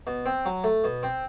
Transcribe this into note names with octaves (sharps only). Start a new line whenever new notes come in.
B2
C4
F#3
A3
B2
C4